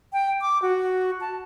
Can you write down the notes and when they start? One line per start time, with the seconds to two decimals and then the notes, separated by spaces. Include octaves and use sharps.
0.13 G5
0.41 D6
0.62 F#4
1.21 A5